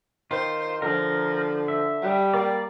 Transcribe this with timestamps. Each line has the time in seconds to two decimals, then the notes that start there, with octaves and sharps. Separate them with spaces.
0.31 D#3 F4 C5
0.82 D3 F3 A#4
1.68 E5
2.02 G3
2.34 A#3 D5